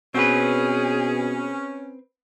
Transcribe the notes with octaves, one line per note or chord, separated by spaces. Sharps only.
B2 C4 C#4 G#4 B4